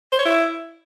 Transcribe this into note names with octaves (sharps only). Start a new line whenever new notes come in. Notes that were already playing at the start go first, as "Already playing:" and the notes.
C5
C#5
E4